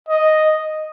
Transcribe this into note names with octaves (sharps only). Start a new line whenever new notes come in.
D#5